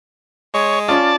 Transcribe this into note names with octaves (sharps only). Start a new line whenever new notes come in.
G#3 C#5
C#4 F4 D5 A5